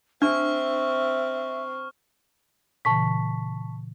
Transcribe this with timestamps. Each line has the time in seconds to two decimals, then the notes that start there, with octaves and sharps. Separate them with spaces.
0.22 C4 D4 E5 C#6 F6
2.85 A#2 C#3 E3 A5 C#6 B6